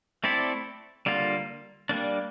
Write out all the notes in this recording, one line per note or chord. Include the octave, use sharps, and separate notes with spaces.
A3 C4 E4 A4 D5
D3 G3 A#3 F4
G3 A#3 D4